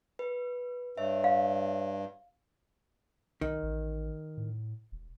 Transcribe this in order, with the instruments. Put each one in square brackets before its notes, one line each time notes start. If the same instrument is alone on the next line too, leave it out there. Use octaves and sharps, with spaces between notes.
[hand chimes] B4
[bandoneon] G2 [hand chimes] C#5 E5
[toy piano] F5
[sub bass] B1 [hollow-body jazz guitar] D#3
[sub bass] A1
A2
E1